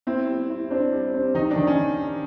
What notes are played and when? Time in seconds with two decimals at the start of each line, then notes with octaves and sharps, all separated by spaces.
0.07 C4 E4
0.28 G3
0.50 E4
0.70 C4 D4
0.92 G3
1.14 C4
1.34 D#3 D#4
1.51 D4
1.56 D#3
1.67 C#4